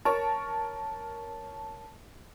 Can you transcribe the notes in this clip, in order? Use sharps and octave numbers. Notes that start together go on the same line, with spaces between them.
A#4 C#5 A5 C#6